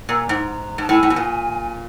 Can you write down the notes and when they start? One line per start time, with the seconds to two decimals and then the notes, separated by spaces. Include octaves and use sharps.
0.09 A#2 A#5
0.29 G#2
0.78 G#2 A5
0.89 A2 G#5
1.03 A2
1.10 B2
1.16 A#2